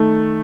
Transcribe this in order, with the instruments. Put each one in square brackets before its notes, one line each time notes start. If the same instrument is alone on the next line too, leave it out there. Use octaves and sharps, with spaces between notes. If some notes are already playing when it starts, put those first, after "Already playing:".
Already playing: [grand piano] D#3 A3